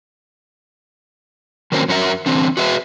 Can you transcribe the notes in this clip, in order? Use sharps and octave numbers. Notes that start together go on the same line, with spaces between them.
D#3 F#3 A#3 C4 C#4
F#2 C#4 F#4 A#4 E5
D3 E3 C4
F#4 G#4 B4 E5